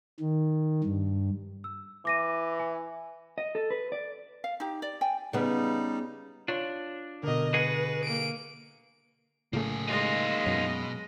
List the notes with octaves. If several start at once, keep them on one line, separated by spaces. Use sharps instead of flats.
D#3
G2
E6
E3 D6 A#6 D#7
G#5
D#5
A4
B4
D5
F5
D#4 G4
D5
G5 G#5
C#3 G3 B3 D#4
D4 F4 C#5
B2 D3 A#4 D#5
F#4 G#4 B4
A#3 D7
A2 C#3 A3 A#3 G#4
G#3 D#4 F4 D#5
F#2 B2 F#3